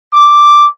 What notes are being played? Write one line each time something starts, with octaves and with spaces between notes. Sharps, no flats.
D6